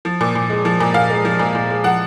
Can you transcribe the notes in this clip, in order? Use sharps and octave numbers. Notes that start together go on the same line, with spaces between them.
F3
A#2
A#2
G#3
F3
A#2
A#2 F5
G#3
F3
A#2
A#2
G#3
F3 F#5